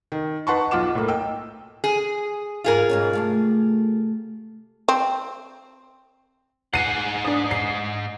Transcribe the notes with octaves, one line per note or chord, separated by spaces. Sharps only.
D#3
D#4 B4 F#5 A5 C6 C#6
B1 F4 F#5 D6 E7
A2 A#3
D#5 G5 E6
G#4
E2 G#2 F4 G#4 A#4
G#2 B2 C#4
C3 A3 F5
C4
G#2 F#5 C7 D#7
D4 D#6
C7